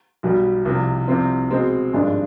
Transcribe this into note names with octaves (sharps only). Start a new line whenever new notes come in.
B1 B2 G3
C2 C3 F3
C2 C3 F3 C4
B2 G#3 C4
G#1 G2 F3 G#3 D4